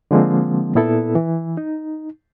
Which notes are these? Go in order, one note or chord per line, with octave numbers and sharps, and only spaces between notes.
D3 F3 G#3 A#3 C4
A#2 B3 E4 A4
E3
D#4